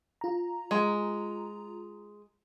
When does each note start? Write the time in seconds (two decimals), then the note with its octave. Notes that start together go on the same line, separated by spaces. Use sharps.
0.21 F4 A#5
0.71 G#3